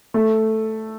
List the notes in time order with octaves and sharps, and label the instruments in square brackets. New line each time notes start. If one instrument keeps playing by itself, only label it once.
[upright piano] A3